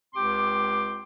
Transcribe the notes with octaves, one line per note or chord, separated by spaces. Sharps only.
C#2 C4 G4 G5 C6 D6